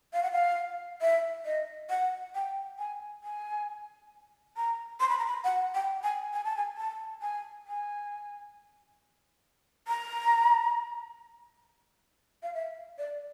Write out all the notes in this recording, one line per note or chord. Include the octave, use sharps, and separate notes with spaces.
F5
F#5
F5
E5
D#5
F#5
G5
G#5
G#5
A#5
C6
B5
A#5
B5
F#5
G5
G#5
G#5
A5
G#5
A5
G#5
G#5
A#5
F5
E5
D5